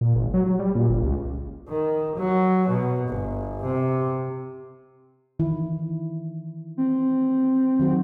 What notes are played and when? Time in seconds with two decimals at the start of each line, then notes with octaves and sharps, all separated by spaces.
0.01 A#2
0.16 G#1
0.34 F#3
0.46 F#3
0.59 G3
0.75 A#2
0.90 G1
1.01 C#2
1.68 D#3
2.17 F#3
2.69 B2
3.09 G1
3.63 C3
5.39 D#3 E3 E4
6.77 C4
7.79 D#3 F#3 F#4